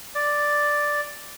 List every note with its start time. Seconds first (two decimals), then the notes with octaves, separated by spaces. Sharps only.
0.15 D5